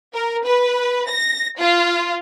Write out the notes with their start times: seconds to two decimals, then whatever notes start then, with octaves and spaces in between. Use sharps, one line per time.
0.14 A#4
0.44 B4
1.08 A#6
1.58 F4